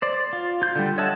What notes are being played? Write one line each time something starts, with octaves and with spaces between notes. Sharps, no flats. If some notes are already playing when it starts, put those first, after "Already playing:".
C5 D5
F4
F4 G6
D3 G3
C#5 D#5 E5 F#5 A5